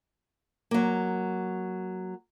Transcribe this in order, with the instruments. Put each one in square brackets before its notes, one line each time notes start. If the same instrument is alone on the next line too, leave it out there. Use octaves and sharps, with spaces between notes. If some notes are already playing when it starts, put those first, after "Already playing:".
[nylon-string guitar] F#3 A#3